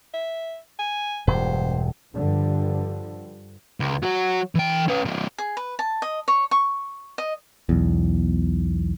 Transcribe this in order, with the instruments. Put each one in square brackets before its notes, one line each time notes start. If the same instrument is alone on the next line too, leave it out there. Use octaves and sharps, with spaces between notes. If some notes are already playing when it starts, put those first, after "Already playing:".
[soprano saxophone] E5
G#5
[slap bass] E1 G2 [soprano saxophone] C5
[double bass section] G2 D3 F3
[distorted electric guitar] C#2
F#3 F#4
E3 G5
C#4 B4
F3 G#3
[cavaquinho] G#4
B4
A5
D#5
C#5
C#6
D#5
[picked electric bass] B1 E2